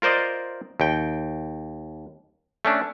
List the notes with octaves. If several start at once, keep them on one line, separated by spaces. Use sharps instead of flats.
F4 A#4 C5 D5 D#5
D#2 G5
A3 C#4 D4